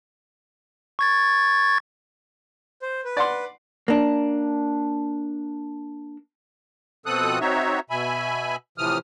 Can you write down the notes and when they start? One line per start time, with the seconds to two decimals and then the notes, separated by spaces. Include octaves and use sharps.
0.99 C#6 G#6 A6
2.82 C5
3.05 B4
3.17 D5 F#5 C6
3.88 A#3 D4
7.06 B2 F3 C4 A4 D#6 F#6
7.41 C4 D#4 F#4 C#5 E5
7.90 B2 E5 G#5 B5
8.78 A2 C3 E3 F3 D#6 F6